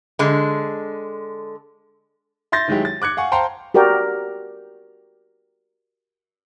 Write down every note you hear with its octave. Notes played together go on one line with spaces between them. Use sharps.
D3 G#3
E5 C6 G6 A6 A#6
D#3 F#3 G#3 E4 G4
A6
D6 F#6 G#6 C#7
F5 F#5 G#5 C#6
C5 F5 G5 A5 A#5 C6
F#4 G4 A#4 D5 G5